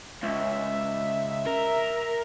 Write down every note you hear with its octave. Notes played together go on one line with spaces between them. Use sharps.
C#2 E5
A#4